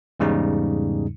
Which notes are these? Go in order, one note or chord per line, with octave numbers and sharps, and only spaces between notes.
E2 G#2 C#3 G3 D#4